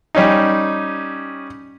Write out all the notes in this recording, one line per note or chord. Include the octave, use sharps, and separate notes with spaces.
G3 C#4 D#4